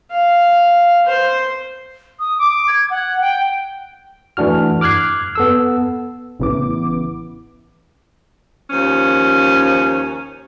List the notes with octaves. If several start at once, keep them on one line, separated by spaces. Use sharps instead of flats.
F5
C5
D#6
D6
G#6
F#5
G5
E3 A3 D4 F#4 F6
D6 F6 F#6 G#6 C7
B3 A4 E6
A1 C#3 B3 E4 D6
D#2 F3 C#4